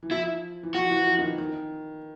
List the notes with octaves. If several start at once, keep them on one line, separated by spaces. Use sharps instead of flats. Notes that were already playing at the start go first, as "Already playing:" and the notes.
E3
F3 E4
E3
F3 F#4
E3
F3
D#3
E3
D#3